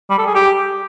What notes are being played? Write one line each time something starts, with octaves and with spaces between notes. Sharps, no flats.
G3
A4
G#4
G4